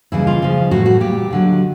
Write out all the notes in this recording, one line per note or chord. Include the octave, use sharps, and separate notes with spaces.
D#2 C#3 E3 G3 E4
F4
D#2 C#3 F3
A2 E3 G3 F#4
F#4
A#2 G3 G4
D#2 D3 F#3